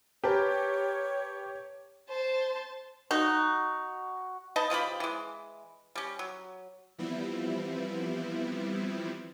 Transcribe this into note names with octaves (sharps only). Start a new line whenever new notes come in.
G4 A#4 B4 C#5 A5
C5 A5
D#4 F#4
D#4 B4 D#5 A5
C#3 F3 G4 B5
E3 G#3
G3 C#4
F#3
E3 F3 G3 B3 C4 E4